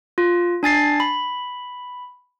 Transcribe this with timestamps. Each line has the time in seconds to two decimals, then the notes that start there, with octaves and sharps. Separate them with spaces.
0.18 F4
0.63 D4 G#5 A6 C7
1.00 B5